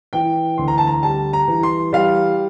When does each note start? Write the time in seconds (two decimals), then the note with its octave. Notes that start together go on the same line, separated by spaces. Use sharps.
0.13 E3 G5
0.58 D2 C6
0.68 A#5
0.78 A5
0.87 A#5
1.03 G3 A5
1.33 A#5
1.48 E3
1.63 C6
1.93 G3 F5